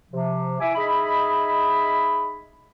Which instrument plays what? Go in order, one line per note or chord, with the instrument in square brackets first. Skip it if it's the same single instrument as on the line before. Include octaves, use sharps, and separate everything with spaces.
[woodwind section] C3 F3
E4 E5 G#5 D6
D#4 G#4 D#5 E5 B5